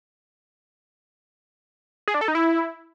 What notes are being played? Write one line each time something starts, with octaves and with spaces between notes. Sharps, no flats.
G#4
D4
A4
D#4
E4